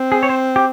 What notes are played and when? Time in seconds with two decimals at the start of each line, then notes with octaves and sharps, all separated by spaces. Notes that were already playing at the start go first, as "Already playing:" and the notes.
Already playing: C4
0.12 G#4
0.23 C#5
0.30 C5
0.56 G4